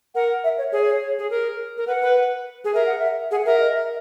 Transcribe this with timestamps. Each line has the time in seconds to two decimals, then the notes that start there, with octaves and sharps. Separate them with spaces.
0.15 A#4 F#5
0.44 E5
0.58 C#5
0.72 G#4 C#5
0.87 C#5
1.19 G#4
1.30 A#4
1.78 A#4
1.87 B4 F#5
2.02 B4
2.65 G#4
2.74 A#4 E5
2.86 F#5
2.98 E5
3.31 G#4 F#5
3.45 A#4 E5
3.59 D#5
3.73 E5